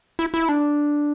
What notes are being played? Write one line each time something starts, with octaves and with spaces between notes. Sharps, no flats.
E4
E4
D4